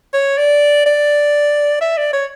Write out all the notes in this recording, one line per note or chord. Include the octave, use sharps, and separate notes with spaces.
C#5
D5
D5
E5
D5
C#5